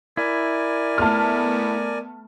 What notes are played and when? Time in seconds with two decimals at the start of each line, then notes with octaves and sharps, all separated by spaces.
0.17 E4 A#4 D5 G#5
0.98 A3 B3 A5 F6